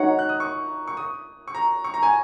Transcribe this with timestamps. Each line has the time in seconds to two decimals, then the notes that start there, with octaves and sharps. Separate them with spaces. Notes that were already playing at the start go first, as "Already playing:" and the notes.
Already playing: D#4 F#4 C#5 F#5 A#5
0.19 F#6
0.29 D#6
0.40 C#6
0.88 C#6
0.97 D#6
1.48 C#6
1.55 A#5
1.84 C#6
1.94 A#5
2.03 G#5